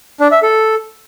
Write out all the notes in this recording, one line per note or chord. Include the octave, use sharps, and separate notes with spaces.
D4
E5
A4